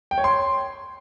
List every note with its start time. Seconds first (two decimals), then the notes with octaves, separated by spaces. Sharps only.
0.11 G5
0.18 C#5
0.24 C6